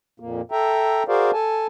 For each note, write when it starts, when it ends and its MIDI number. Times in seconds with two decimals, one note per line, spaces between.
0.20 0.41 41
0.20 0.41 46
0.20 0.41 58
0.51 1.03 69
0.51 1.03 76
0.51 1.03 79
0.51 1.03 82
1.08 1.31 66
1.08 1.31 68
1.08 1.31 70
1.08 1.31 72
1.08 1.31 74
1.08 1.31 77
1.33 1.67 69
1.33 1.67 80
1.33 1.67 81